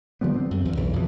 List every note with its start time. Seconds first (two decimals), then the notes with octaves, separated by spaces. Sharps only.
0.21 D3 F3 G3 B3
0.36 C4
0.51 F#2
0.65 E2
0.77 B1 C#3 E3
0.93 F2 B2 E3